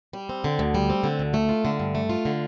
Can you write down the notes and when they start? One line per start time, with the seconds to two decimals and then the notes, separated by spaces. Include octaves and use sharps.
0.13 G3
0.29 C4
0.44 D3
0.59 D2
0.75 G3
0.90 C4
1.04 D3
1.19 D2
1.34 A3
1.49 F4
1.65 D3
1.80 G2
1.95 A3
2.09 F4
2.25 D3